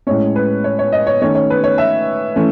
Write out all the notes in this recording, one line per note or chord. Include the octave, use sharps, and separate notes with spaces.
A2 G#3 C#4 C#5
B4
C#5
C#5
D#5
C#5
D#3 A3 C#4 C#5
C#5
B4
C#5
E5
E3 A3 C#4